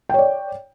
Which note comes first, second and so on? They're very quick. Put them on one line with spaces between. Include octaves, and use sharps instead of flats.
G5 C#5 D5